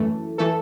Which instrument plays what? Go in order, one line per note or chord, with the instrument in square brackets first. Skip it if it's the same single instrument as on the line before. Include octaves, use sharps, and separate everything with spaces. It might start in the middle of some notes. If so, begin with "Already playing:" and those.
Already playing: [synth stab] F#2 E3 A3
E3 A3 A4